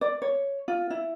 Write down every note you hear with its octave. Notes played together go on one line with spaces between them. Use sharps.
D5
C#5
F4
E4